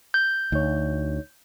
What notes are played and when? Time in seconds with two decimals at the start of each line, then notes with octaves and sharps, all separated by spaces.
0.14 G6
0.52 D2 D#4 C#5